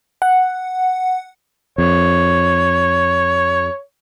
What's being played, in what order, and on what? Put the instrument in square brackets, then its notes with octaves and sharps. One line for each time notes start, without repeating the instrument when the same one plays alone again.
[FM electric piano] F#5
[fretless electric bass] F2 [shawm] C#5